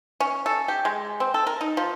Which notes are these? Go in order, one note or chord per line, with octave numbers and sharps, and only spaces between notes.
C#4
A4
G4
G#3
C4
A4
A#4
D#4
F3